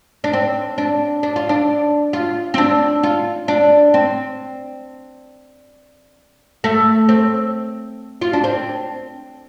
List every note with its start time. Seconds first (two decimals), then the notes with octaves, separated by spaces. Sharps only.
0.24 D4
0.33 C4
0.78 D4
1.23 D4
1.36 F4
1.49 D4
2.13 F4
2.54 C4
2.58 D4
3.03 F4
3.48 D4
3.94 C4
6.64 A3
7.09 C4
8.21 F4
8.33 D4
8.44 C4